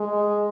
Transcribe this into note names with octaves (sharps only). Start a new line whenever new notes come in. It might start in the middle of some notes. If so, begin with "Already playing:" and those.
Already playing: G#3